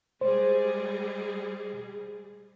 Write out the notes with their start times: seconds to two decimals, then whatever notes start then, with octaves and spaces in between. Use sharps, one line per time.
0.21 G3 G#3 G#4 C5